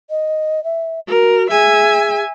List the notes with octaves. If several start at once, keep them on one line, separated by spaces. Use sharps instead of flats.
D#5
E5
F#4 A#4
G#4 E5 G#5